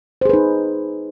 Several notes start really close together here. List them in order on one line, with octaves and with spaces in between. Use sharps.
C5 G#4 B4 D#4